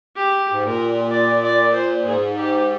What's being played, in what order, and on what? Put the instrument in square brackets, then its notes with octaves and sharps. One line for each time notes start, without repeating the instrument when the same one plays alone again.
[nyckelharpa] G4
[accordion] G#2
[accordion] A#2 [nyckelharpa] A#4
[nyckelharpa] D5
D5
C5
[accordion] G#2 [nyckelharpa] G#4
[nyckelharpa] G4